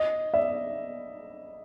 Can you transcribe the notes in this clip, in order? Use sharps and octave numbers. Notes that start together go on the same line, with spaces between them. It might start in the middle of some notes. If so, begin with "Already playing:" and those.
Already playing: D#5
D5 E5